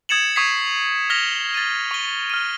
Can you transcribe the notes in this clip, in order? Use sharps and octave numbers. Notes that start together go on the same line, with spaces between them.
D#6 G#6 A6 C#7 E7 F#7
C#6 D#6 G#6 B6 C7
F6 A#6 B6 F7 G7
A6 D#7
C#6 G7
F6 D#7